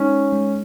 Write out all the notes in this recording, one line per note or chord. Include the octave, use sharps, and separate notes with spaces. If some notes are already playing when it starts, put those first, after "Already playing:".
Already playing: G#3 C#4 D#4
G#3